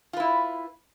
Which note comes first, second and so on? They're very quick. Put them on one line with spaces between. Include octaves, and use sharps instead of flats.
F4 B4 E4